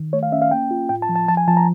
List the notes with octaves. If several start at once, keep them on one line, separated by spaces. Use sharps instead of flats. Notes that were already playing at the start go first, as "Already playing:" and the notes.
Already playing: D#3
A3 C#5
F5
C#4 E5
F5
A#3 G5
F4
A2 G5
A5
F3
A5
F3 A5
G#5
F3 A5
A#5